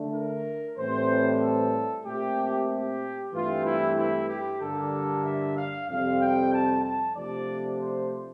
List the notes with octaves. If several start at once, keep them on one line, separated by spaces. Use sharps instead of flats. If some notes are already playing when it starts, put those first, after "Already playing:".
Already playing: D3 A3 D4
A#4
A2 E3 G3 C4 C5
A4
A#2 A3 C4 G4
G4
G2 E3 A3 C4 F4
E4
E4
G4
G2 D3 G3 A#3 D4 A4
E5
F5
F2 C3 G3 C4 F5
G5
A5
A5
C3 F3 A3 D4 D5
C5